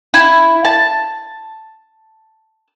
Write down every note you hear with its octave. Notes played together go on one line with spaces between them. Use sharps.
E4
A5